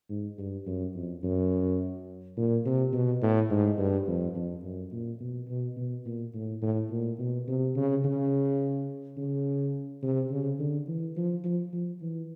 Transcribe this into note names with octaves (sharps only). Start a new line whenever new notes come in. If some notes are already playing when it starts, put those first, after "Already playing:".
G#2
G2
F#2
F2
F#2
A#2
C3
B2
A2
G#2
G2
F2
F2
F#2
A#2
B2
B2
B2
A#2
A2
A2
A#2
B2
C3
C#3
C#3
C#3
C3
C#3
D3
E3
F3
F3
F3
E3